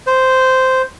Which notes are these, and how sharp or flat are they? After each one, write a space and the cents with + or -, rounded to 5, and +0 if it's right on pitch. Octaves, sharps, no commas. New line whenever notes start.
C5 -10